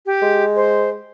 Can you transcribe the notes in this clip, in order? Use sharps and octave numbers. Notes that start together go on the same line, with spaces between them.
G4
G#3
C5